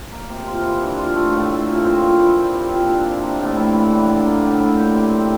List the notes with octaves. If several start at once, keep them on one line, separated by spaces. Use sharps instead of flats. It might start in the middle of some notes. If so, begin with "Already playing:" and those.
A#3
C3
F4
E3
D4
F4
A3
A2
A3
A#2
C4
A#2
E4
G4
C4
A#2
D4
C3
A#3
A2
E4
E3
D4
D3
A#3
A2
E4
G4
C4
G4